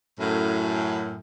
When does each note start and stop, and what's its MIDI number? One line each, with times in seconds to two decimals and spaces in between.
0.20 1.18 42
0.20 1.18 45